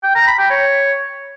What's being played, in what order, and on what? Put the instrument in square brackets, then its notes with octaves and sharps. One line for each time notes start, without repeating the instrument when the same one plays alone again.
[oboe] G5
A#5
B5
G5
C#5